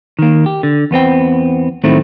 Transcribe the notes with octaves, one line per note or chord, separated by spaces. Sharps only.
D#3 A#3
G4
D3
E2 B3 C4 G5
A2 D#3 F#3 A3 C4 E4